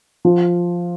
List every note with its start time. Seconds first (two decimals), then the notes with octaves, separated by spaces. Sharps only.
0.25 F3